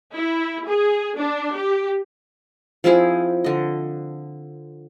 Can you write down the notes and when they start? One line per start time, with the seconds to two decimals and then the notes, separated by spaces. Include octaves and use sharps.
0.15 E4
0.69 G#4
1.18 D4
1.57 G4
2.84 F3 C4 E4 G#4
3.44 D3 D#5